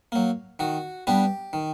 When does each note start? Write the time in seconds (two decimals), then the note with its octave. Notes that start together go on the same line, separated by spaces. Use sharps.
0.12 F#3 A#3
0.59 D#3 F#4
1.07 G3 B3 D4 G4
1.53 D#3